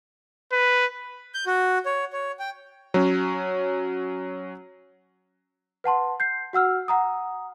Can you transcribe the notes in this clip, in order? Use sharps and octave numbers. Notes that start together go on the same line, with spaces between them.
B4
G6
F#4
C#5
C#5
G5
F#3 C#4
B4 F#5 A5 C6
G6 C7
F#4 F#5 E6 F6
F#5 A#5 D#6